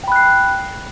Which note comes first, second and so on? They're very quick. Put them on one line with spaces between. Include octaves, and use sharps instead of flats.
G5 B5 F#6 C7